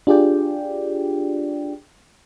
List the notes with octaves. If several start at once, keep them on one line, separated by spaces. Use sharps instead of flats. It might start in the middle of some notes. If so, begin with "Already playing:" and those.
D4 F4 G4 G#4 D5 G5